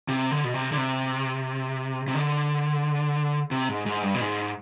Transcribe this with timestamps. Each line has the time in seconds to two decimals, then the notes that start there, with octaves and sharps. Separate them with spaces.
0.09 C3
0.31 D3
0.44 B2
0.54 C3
0.72 D3
0.77 C3
2.08 C3
2.15 D3
3.51 C3
3.69 G#2
3.86 G#2
4.03 G2
4.15 B2
4.21 G#2